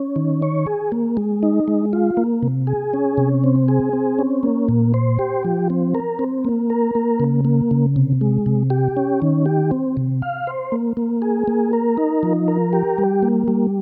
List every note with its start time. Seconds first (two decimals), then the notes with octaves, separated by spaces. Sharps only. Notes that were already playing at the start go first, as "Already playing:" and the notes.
Already playing: C#4
0.16 D#3
0.42 C#5
0.66 G#4
0.92 A#3
1.17 G#3
1.43 D#4
1.68 G#3
1.93 F4
2.17 A#3
2.43 C3
2.67 G#4
2.93 C#4
3.17 C3
3.44 C4
3.68 G#4
3.93 C4
4.19 C#4
4.43 A#3
4.69 A#2
4.94 C5
5.19 G4
5.45 F3
5.70 C4
5.95 A#4
6.19 C4
6.45 A#3
6.70 A#4
6.95 A#3
7.20 C#3
7.45 A#3
7.71 C#3
7.96 C3
8.21 G#3
8.46 C3
8.70 G4
8.97 C#4
9.22 D#3
9.46 G4
9.71 C4
9.97 C3
10.22 F5
10.47 C5
10.72 A#3
10.97 A#3
11.22 G#4
11.48 A#3
11.73 A#4
11.97 D#4
12.23 F3
12.48 A#4
12.73 G4
12.98 G3
13.23 A#3
13.48 G3